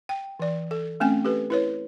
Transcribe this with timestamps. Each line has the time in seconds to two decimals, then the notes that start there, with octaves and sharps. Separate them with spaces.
0.09 G5
0.39 E3 D5
0.71 A4
1.00 A3 C4 C#4 G#5
1.25 G4 A4 B4
1.50 E4 B4 C#5